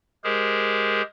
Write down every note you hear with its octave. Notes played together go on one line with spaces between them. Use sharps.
G#3 G4 G#4 A#4 C5